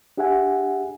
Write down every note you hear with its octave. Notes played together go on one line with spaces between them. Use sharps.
D4 G4 G#4 E5 F#5 G#5